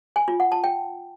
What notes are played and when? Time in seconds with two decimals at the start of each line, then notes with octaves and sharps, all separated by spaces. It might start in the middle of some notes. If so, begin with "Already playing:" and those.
0.16 G#5
0.28 F4
0.40 F#5
0.52 A5
0.64 G5